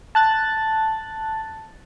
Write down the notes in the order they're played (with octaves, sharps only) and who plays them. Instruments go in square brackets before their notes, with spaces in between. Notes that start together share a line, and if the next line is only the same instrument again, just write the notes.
[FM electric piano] A5 F#6 A6